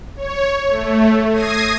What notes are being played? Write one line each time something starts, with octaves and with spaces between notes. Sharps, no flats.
C#5
A3
D#6 G#6 A#6 C7 D#7